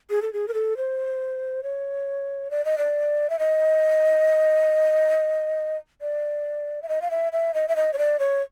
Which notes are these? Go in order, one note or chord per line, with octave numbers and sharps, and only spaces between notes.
G#4
A4
G#4
A#4
A4
C5
C#5
D5
D#5
D5
E5
D#5
D5
E5
D#5
F5
E5
E5
D#5
E5
D#5
C#5
D5
C#5